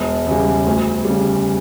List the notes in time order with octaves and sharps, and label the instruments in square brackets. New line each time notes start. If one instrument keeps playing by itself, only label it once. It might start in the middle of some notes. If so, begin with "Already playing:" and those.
Already playing: [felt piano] E1
E2 C#3 G3
D2
C#3 G3